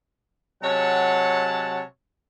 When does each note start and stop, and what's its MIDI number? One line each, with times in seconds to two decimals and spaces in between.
0.63 1.82 48
0.63 1.82 54
0.63 1.82 56
0.63 1.82 73
0.63 1.82 78
0.63 1.82 81